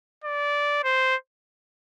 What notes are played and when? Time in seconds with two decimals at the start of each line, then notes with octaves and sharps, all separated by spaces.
0.24 D5
0.84 C5